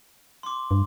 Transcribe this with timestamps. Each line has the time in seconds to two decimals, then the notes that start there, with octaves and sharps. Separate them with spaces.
0.43 C6 D6
0.71 G2